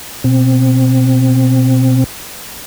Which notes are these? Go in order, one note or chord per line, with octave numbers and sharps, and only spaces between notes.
B2 C4